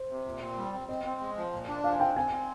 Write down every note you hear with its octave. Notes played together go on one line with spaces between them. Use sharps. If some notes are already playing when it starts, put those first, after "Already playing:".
Already playing: C5
C3
A#2
C4
G3
C4
C4 D#5
C4
G#3
F3
A#2
D4
F3 F5
G#5
C4 G5
C4 G#5
C4